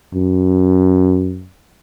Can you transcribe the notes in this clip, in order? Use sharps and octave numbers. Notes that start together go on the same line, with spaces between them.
F#2